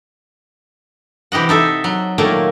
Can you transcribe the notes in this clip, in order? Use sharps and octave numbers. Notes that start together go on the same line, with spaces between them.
C3 E3 G4 D#5 F#5
D#4 A4 E5
F#3
A#2 D#3 A3 A#3